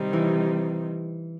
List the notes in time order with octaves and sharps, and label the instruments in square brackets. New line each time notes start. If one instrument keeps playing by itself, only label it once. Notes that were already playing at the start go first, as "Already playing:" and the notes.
Already playing: [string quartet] C3 D#3 G3 C4 D#4
[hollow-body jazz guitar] E3